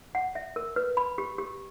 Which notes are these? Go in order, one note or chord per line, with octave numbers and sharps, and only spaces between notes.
F#5
E5
A#4
B4
B5
G4
G4